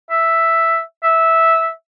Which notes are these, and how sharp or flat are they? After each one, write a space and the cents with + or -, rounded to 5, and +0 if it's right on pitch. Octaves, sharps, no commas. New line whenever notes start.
E5 +0
E5 -10